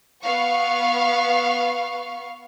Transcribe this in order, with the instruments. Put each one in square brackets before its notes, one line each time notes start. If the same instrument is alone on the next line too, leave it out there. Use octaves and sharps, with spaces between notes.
[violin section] B3 F5 C#6